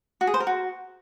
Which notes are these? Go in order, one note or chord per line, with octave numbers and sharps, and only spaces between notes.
F#4
G#4
C5
A#4
F#4